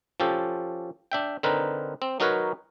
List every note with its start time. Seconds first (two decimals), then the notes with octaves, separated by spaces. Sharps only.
0.20 F3 C#4 G4 A4
1.12 D4 E5 G5
1.43 D3 C4 D#4 A#4 B4
2.02 C4
2.20 F#3 D#4 F#4 A#4 B4 C#5